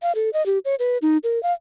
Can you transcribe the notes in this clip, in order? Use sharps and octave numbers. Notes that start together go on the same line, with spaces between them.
F5
A4
D#5
G4
C#5
B4
D#4
A#4
F5